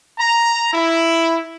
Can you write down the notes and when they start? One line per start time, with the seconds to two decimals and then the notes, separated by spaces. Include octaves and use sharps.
0.19 A#5
0.74 E4